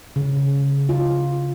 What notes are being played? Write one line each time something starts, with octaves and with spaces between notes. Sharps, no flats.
C#3
F4